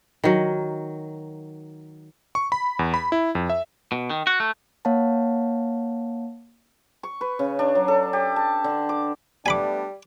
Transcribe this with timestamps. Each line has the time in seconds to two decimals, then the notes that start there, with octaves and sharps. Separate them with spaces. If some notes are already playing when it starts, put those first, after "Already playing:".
0.24 D#3 F#3
2.35 C#6
2.52 B5
2.79 E2
2.94 B5
3.12 E4
3.35 F2
3.50 E5
3.92 B2
4.10 D#3
4.27 F#4
4.40 A3
4.85 A#3 C#5 F5 F#5 A5
7.03 C#6
7.21 B4
7.39 C#3
7.59 D4
7.75 F#3
7.88 A4
8.13 G4
8.36 A5
8.64 D3
8.89 D6
9.46 G3 A3 B3 D4 G#5 B5 D6